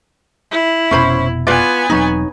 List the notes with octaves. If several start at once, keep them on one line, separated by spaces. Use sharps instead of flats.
E4
F1 B2 C#4 C5 B5
B3 F4 B4 D5 G#5
E1 F#3 C4 D#4 C#5